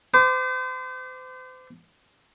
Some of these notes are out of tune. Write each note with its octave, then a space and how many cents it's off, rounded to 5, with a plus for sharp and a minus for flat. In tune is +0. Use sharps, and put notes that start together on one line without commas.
C5 -40 D6 +0